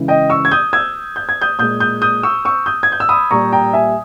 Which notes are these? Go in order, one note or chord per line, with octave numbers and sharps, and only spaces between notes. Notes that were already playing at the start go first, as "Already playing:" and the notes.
Already playing: C#3 E3 G#3
D#5 G5
C#6 E6
G#6
D#6 G6
E6 G#6
G6
G#6
D#6 G6
A#2 G#3 D#6 G6
D#6 G6
D#6 G6
C#6 E6
C#6 E6
D#6 G6
G#6
G6
E6
B5 D#6
A#2 G3 A#5 C#6
G5 A#5
E5 G#5